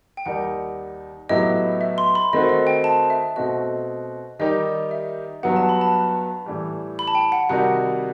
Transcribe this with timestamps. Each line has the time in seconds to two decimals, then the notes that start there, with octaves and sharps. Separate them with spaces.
0.17 G5
0.26 D#2 D#3 G3 D#4 F#5
1.29 A2 F#3 B3 E4 G4 D#5
1.81 E5
1.98 C6
2.15 B5
2.33 D#3 A3 C4 F#4 D#5
2.49 D#5
2.67 G5
2.84 A5
3.10 E5
3.36 B2 A3 C4 F#4 D#5
4.39 D#3 G3 D#4 G4 D#5
4.91 E5
5.43 G2 F#3 B3 F#5
5.56 A5
5.69 B5
5.81 A5
6.46 A2 E3 G3
6.99 B5
7.08 A5
7.15 G5
7.32 F#5
7.49 C3 D#3 G3 D#4 F#4 F#5